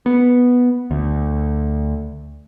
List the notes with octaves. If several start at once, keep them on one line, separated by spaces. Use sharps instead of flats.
B3
D2